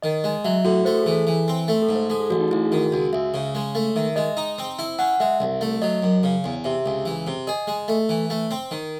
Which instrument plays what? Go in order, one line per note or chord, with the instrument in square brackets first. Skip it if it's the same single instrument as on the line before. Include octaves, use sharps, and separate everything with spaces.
[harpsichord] D#3 [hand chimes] D#5
[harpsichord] G#3 [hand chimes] D#5
[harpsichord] F#3 [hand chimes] E5
[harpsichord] A2 [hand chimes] F#4
[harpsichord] A3 [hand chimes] C5
[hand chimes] A4
[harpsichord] E3 [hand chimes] G#4
[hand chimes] A4
[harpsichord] E3
C4
A3
[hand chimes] A4
[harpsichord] G#2
[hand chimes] C5
[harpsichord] G#3 [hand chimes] A4
[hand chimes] G#4
[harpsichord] A1 [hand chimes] F#4
[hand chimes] D#4
[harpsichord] A1 [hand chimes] E4
[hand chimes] G#4
[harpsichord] D#3 [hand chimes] F#4
[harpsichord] C#2 [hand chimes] F#4
[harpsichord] C#2 [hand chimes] E5
[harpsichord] C#3
G#3
A3
[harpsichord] D#3 [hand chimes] E5
[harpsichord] G#3 [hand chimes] D#5
[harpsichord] D#4
C4
E4
[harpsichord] C#4 [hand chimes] F#5
[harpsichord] G#3 [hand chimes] E5
[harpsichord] C2
A3
[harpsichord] F#3 [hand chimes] D#5
[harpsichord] F#2
C#3
E2
[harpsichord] C3 [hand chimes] E5
[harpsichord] C#2
E3
C3
[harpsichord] G#4 [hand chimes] D#5
[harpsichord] G#3
A3
E3
A3
C4
D#3